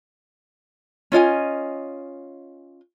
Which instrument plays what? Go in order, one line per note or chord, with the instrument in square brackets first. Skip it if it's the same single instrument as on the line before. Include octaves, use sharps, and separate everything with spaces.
[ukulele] C#4 F4 D#5 G#5